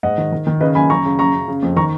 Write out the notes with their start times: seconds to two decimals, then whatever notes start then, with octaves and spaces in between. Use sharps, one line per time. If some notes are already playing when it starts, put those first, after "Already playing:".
0.03 G#2 D#5 F#5
0.18 D#3
0.32 D#3
0.47 D#3
0.60 C#3 B4 D#5
0.75 F#2 G#5 B5
0.90 F#2 A#5 C#6
1.05 C#3
1.19 F#2 A#5 C#6
1.34 F#2
1.48 C#3
1.62 F2
1.76 D#3 A#5 C#6